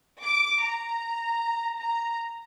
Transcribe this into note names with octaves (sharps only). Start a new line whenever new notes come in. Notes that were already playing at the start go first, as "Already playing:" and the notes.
D6
A#5
A#5